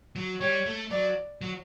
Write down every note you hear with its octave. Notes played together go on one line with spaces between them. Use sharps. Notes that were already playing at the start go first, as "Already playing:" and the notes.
F#3
G3 C#5
A3
F#3 D5
F#3